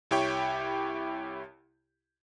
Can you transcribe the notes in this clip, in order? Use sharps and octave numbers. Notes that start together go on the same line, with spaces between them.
C2 E4 G4 C#5 G5